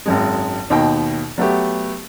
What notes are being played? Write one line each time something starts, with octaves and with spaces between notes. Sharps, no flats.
G#1 F#2 G#3
D#2 B2 D#4 G5
F#3 A3 B3 G4